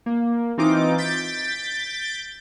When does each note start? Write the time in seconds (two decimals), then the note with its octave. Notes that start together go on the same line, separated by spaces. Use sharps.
0.06 A#3
0.58 E3 C4 D#4 F4 D6
0.98 G6 A6 B6 D7